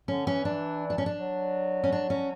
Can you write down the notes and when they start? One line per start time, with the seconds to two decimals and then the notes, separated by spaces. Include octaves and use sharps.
0.08 D3 C#4
0.27 E3 C#4
0.45 D4
0.90 D4
0.98 C#4
1.06 D4
1.18 F#3
1.84 C#4
1.92 D4
2.10 C#4